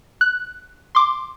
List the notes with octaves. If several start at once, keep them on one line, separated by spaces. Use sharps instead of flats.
F#6
C6 D6